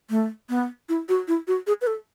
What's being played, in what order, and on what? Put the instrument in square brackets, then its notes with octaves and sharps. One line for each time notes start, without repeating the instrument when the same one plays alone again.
[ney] A3
B3
E4
F#4
E4
F#4
G#4
B4
A4